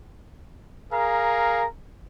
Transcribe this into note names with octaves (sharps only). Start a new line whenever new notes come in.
G#4 A#4 F5 A#5